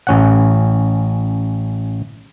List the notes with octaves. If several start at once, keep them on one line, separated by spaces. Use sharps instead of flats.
A1 C#4 F#5